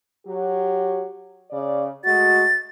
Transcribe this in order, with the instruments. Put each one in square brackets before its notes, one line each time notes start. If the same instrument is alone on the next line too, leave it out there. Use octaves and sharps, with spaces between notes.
[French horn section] F#3 G4
C#3 D5
[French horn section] G#3 A3 F#4 [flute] A6